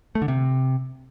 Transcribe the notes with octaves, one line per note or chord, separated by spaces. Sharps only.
A3
D3
C3